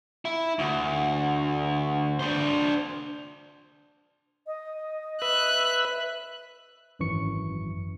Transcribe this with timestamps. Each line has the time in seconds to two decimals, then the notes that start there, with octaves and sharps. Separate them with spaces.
0.25 E4
0.59 D2
2.19 D4 C5
4.47 D#5
5.22 B4 E5 F#6
6.99 G#1 F#2 E3 C#6 C#7